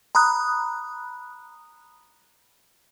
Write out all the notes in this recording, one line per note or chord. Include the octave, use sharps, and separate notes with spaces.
A#5 B5 D#6 F#6